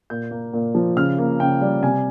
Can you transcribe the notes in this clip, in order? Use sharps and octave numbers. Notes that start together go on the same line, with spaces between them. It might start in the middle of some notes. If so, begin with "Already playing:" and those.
A#2 G6
A#3
A#2
F3
C#3 F6
A#3
C#3 G5
G3
C3 G#5